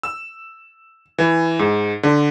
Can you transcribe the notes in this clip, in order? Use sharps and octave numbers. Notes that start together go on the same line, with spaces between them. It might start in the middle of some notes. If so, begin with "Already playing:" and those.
E6
E3
G#2
D3